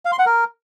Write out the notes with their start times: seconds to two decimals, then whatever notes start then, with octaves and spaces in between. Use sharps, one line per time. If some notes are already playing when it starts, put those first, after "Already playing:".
0.05 F5
0.12 C6
0.19 F#5
0.26 A#4